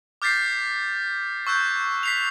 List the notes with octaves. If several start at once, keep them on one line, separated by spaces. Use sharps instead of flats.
D6 F6 G6 A6 B6 C7
C#6 E6 F#6 G6
B6 C7 F7